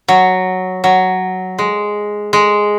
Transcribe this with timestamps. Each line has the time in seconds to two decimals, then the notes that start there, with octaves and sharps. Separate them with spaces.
0.08 F#3
0.84 F#3
1.59 G#3
2.33 G#3